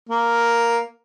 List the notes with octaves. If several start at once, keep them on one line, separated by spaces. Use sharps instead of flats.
A#3